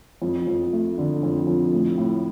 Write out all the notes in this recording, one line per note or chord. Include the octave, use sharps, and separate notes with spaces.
F2
F2
A3
D3
F2
F2
A2
A2